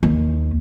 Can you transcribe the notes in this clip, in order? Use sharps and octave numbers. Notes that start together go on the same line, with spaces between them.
D#2